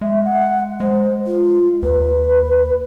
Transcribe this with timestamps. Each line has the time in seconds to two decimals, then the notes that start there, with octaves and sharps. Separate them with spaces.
0.01 G#3 E5
0.25 F#5
0.80 G#3 C5
1.26 F4
1.82 D#2 B4